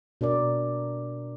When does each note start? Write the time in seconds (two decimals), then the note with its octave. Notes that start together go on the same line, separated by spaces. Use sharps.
0.21 B2 D4 A#4 D5